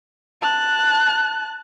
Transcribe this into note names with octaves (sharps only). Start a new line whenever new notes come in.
A5 F#6